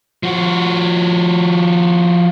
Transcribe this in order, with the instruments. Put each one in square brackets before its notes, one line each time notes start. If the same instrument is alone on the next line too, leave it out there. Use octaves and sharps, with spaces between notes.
[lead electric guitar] F3 F#4